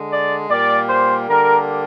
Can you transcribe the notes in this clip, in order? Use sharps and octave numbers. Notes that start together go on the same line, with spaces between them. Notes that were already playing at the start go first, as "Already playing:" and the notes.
Already playing: D3 G#3
D5
A#2 G3 A#3 D5
C5
D3 G3 A#3 A#4